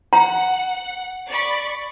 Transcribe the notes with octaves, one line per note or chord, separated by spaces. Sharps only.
F#5 A#5
D5 B5 C#6